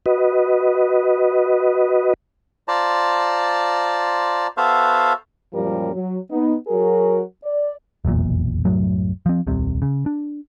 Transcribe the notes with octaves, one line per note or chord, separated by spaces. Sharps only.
F#4 B4 D#5
F4 C5 D5 A5 A#5
B3 F#4 A4 C5 E5 F5
F#2 A#2 F3 G3 G4 A#4
F#3
B3 D#4
F#3 F#4 G#4 A#4
D5
F1 B1 E2 A#2
C2 F#2 A2 F#3
F3 C4
D#1 C2 C3
C#3
D4